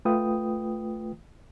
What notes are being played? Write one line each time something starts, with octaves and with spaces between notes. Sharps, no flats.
A3 F4 B4 G5 D#6